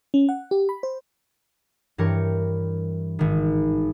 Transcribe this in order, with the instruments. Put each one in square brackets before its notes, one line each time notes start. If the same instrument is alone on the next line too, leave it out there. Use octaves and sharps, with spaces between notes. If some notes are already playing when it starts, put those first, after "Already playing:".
[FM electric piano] C#4
F#5
G4
B5
C5
[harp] G2 E3 G4 A#4 C#5 C#7
G#1 D#3